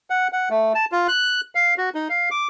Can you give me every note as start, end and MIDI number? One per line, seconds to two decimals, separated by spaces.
0.10 0.28 78
0.33 0.49 78
0.50 0.73 57
0.75 0.85 81
0.92 1.07 65
1.08 1.41 90
1.55 1.74 77
1.78 1.89 66
1.95 2.08 63
2.09 2.29 77
2.31 2.48 86